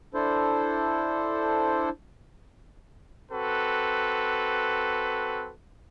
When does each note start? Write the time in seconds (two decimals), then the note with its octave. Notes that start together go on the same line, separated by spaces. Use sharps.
0.14 D4 E4 A4 C5
3.32 C4 F#4 A4 B4